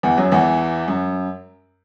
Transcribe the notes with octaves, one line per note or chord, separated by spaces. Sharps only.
E2 E3
F#2 F#3
E2 E3
F#2